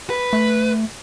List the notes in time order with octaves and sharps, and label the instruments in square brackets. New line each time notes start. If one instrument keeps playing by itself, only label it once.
[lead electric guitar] B4
[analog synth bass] A3